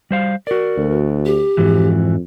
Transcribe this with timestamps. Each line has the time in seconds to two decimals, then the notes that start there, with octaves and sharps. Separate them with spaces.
0.11 G3 C5 F5
0.47 F#4 A#4 D5
0.77 D2
1.26 G4
1.57 F2 G#2 E3 F#4